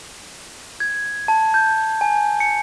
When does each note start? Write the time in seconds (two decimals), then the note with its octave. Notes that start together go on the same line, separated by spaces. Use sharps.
0.80 G#6
1.28 A5
1.54 G6
2.01 G#5
2.40 C#7